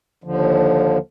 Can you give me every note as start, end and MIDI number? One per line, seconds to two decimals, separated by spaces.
0.24 0.98 39
0.24 0.98 50
0.24 0.98 53